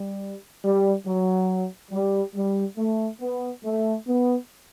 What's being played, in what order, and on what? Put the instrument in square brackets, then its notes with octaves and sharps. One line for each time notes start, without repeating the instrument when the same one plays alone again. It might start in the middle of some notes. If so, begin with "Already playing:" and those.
Already playing: [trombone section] G3
G3
F#3
G3
G3
A3
B3
A3
B3